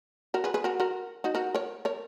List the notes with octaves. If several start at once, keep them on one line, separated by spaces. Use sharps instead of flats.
F#4 A#4
G#4 B4
G#4 B4
F#4 A#4
F#4 A#4
D#4 F#4
F#4 A#4
A#4 C#5
A#4 C#5